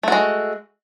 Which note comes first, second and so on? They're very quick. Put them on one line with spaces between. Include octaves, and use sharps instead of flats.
A3 F#4 G#3